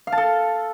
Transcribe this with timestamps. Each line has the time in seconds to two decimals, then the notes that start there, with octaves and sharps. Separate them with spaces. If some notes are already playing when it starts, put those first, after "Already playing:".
0.07 F5
0.12 A5
0.18 A4